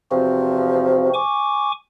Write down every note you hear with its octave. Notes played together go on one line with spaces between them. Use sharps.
E2 C3 F3 C4 F#4
G#5 C#6 D6